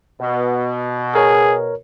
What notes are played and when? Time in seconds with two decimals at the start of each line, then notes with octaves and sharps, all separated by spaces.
0.21 B2
1.15 G#4 A#4 C#5